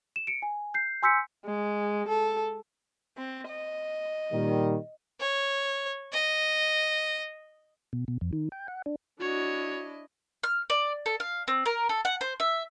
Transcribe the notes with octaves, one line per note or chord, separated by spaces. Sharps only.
E7
C#7 D7
G#5
G6 C7
G#5 C6 E6 G6 B6 C#7
G#3
A4
C4
D#5
A#2 D#3 G3
C#5
D#5
B2
B2
F2
D#3
G5
F#5
D4
D4 E4 F#4 C#5 D#5
F6
D5
A4
F5
C4
A#4
A4
F#5
C5
E5